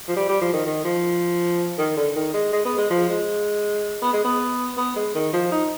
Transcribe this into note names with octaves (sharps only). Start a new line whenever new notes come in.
F3
G3
G3
F3
D#3
D#3
F3
D#3
D3
D#3
G#3
G#3
B3
G#3
F3
G#3
B3
G#3
B3
B3
G#3
D#3
F3
D#4